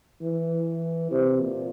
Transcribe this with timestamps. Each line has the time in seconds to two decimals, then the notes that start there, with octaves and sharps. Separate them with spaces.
0.21 E3
1.11 C3
1.41 A#2